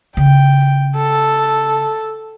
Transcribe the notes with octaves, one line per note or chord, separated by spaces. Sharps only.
C#3 G5
A4